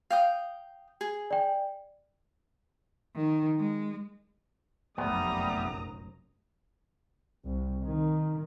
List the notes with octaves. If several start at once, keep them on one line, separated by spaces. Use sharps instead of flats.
F5 G5 D#6
G#4
D5 G5
D#3
G#3
F1 A#1 F#2 G3 A3 B3 A#5 D#6
C2
D#3